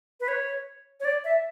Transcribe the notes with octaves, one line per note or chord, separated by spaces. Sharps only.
B4
C#5
C#5
D5
E5